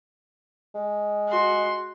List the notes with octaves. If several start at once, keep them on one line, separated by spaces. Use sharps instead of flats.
G#3
F#4 C6